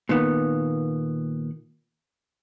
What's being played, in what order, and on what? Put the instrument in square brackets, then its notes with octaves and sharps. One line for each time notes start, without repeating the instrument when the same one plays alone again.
[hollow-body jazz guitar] A#2 D#3 B3